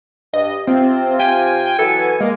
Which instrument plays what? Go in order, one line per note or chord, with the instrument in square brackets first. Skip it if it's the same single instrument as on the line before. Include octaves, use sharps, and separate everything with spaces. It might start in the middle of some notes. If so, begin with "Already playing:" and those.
[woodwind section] G2 [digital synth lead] D#5
[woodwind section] C3 F4 [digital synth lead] C4
[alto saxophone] G5 [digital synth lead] G#5
[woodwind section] E3 F#3 B3 [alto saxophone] A4
[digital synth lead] G#3 [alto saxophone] A#3